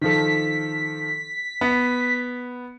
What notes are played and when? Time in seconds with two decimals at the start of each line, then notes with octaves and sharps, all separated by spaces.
0.01 D#3 F3 A4 B6
1.61 B3